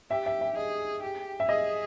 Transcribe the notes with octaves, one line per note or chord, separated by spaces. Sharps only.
G4 E5
E5
E5
G#4 D#5
G4
E5
G#4 D#5